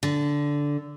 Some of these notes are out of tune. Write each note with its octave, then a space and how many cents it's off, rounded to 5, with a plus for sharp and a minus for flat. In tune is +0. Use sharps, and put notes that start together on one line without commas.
D3 -10